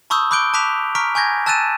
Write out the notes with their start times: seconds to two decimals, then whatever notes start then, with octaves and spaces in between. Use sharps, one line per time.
0.10 A5 B5 C#6 D#6 E6 G6
0.31 B5 D6 F#6 G6 D7 G7
0.54 A5 D6 F#6 B6 F7
0.95 A#5 C#6 F6 B6 D7
1.15 G#5 C#6 G6 G#6 A#6
1.46 A5 E6 F#6 A6 D#7 E7